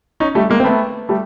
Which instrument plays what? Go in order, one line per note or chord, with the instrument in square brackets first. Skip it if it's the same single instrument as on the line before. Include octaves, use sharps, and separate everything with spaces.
[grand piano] C#4 D#4
G3 A3
G#3 A#3
C4
A3 B3
G3 A3